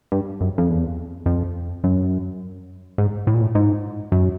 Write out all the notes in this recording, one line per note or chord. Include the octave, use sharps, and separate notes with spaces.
G2
F#2
F2
E2
F2
F#2
G#2
A2
A#2
A2
G#2
F#2